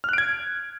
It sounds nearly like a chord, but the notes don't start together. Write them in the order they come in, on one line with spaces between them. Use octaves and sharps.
F6 F#6 D7 G#6